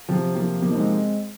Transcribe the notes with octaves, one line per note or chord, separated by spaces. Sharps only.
C3 F3
F3 A#3
F3 A#3
D#4
G#3 C4